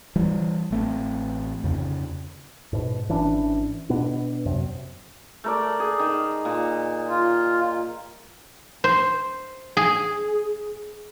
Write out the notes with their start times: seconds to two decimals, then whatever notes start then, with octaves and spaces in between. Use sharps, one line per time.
0.16 E3 G3
0.71 A1 A3 C4
1.64 F2 C#3
2.73 G#2 B2
3.09 G#1 E3 C#4 D4
3.89 B2 B3 D4
4.46 F#2 C3
5.44 A3 A#4 D5
5.80 G#4
5.99 D#3
6.45 A#2
7.08 F4
8.84 C5
9.77 G#4